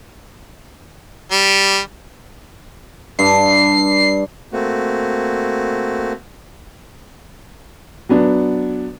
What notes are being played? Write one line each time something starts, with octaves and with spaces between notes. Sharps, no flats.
G3
G2 C7
A3 A#3 C4 F#4
F#3 B3 D4